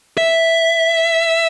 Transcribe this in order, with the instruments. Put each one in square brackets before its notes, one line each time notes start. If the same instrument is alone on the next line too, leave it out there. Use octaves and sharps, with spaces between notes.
[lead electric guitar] E5